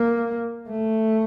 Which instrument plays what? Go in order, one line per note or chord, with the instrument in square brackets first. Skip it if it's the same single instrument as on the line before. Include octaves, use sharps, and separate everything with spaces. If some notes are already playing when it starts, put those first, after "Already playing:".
Already playing: [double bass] A#3
A3